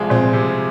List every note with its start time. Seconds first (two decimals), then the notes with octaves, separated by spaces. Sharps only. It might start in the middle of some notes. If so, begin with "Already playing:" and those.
Already playing: C2 F3 G#3
0.10 A#2 C4
0.33 C3